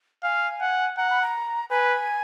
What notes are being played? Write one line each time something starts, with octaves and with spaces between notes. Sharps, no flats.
F5 G#5
F#5
F#5 A#5
B5
A#5
B4 G#5